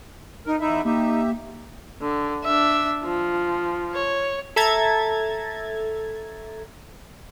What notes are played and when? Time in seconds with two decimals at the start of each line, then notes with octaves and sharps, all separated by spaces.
0.46 D#4 A#4
0.60 E2 D#4 E4 E5
0.85 A#3 D#4 G4 E5
2.01 D3
2.44 D4 E5
3.04 F3
3.94 C#5
4.56 A4 E5 A#5 G#6 A6